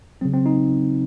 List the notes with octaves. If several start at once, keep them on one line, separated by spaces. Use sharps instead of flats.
C#3 F#3 C4
C4
D#4